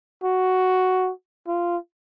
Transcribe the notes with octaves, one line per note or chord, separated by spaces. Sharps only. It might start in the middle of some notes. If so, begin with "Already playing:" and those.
F#4
F4